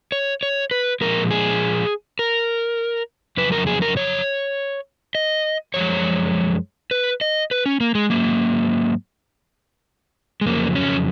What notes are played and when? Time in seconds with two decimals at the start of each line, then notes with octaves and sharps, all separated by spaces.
0.12 C#5
0.43 C#5
0.71 B4
1.01 A#2 F3 G#3 A#4
1.31 G#4
2.19 A#4
3.37 F2 C#3 F#3 B4
3.52 A#4
3.67 G#4
3.82 A#4
3.97 C#5
5.15 D#5
5.74 F#2 F3 G#3 C#5
6.91 B4
7.21 D#5
7.51 B4
7.66 C#4
7.80 A#3
7.95 G#3
8.10 G#2 F#3 A#3
10.41 G#3
10.46 F2 C#3 F#3 A#3
10.76 C#4